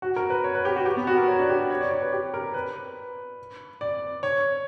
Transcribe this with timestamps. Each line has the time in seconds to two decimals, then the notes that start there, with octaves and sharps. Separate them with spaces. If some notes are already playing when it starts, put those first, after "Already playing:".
0.02 F#4
0.16 A#4
0.30 B4
0.44 C#5
0.55 B4
0.65 G4
0.76 F#4
0.86 G4
0.97 B3
1.07 F#4
1.18 A#4
1.28 C#5
1.39 D4
1.49 G4
1.70 C#5
1.81 D5
1.91 C#5
2.02 B4
2.13 G4
2.34 A#4
2.54 B4
3.81 D5
4.23 C#5